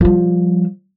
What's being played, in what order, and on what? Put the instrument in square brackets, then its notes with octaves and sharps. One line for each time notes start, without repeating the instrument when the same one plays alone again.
[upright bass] F3 G3